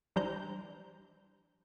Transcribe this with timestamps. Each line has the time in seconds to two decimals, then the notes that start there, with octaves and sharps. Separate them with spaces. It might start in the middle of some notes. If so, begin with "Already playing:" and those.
0.16 E3 G3 D4 C5 A#5 G6